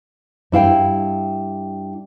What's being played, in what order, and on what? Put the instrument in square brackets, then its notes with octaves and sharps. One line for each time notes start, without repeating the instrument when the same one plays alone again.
[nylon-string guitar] G2 E4 F5 G5